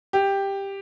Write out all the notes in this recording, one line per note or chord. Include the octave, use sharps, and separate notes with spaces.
G4